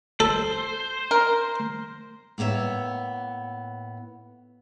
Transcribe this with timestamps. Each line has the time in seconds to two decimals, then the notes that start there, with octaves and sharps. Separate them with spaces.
0.20 A4 C5
1.11 A#4
2.38 A2 A#3 B3 C#5 E5